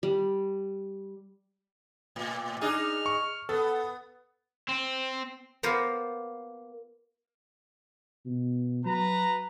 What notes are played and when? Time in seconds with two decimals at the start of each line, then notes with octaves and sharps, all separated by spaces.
0.03 G3
2.16 A2
2.61 D4 D#4 G#4 F6
3.06 C#6
3.49 B3 A4
4.69 C4
5.63 A#3 B3 F4 A#4 C5
8.26 B2
8.86 F#3 B4 A#5